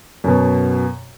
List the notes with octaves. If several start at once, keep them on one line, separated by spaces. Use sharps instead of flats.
F#2 B2